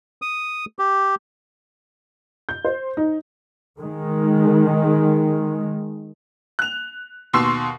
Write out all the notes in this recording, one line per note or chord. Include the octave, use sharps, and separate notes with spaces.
D#6
G4
G6
C5
D#4
D#3 G#3
F#6 F7
D#2 B2 C6 C#6 E6 C7